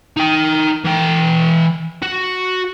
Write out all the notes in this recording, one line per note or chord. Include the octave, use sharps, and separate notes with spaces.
D#4 G5
E3 G5
F#4